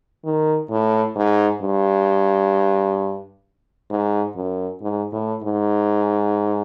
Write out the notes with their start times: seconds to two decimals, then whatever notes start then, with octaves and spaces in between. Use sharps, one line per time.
0.25 D#3
0.70 A2
1.16 G#2
1.62 G2
3.90 G#2
4.36 F#2
4.82 G#2
5.12 A2
5.43 G#2